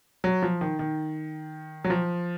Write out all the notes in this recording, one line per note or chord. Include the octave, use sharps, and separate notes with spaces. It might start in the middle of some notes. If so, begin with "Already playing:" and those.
F#3
F3
D#3
D#3
F#3
F3